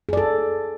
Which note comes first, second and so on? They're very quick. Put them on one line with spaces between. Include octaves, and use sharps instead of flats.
G#4 D5 A4